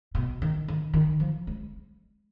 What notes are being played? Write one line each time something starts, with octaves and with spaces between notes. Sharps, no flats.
B2
D#3
D#3
D#3
F3
G#3